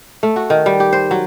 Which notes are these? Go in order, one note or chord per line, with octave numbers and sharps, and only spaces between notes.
A3
F#4
D#3
G3
G4
C5
F#3